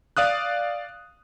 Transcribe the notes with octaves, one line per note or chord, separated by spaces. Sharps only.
D5 F5 D#6 F#6